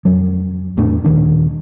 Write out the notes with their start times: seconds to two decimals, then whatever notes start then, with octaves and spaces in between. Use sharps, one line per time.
0.05 F2 F#3
0.77 E2 A2 A3 D4
1.04 D#1 D#2 D#3 D4